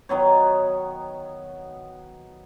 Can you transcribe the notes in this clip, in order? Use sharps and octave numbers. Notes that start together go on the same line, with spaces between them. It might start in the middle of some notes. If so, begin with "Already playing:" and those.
D#3 F#3 B3 C#5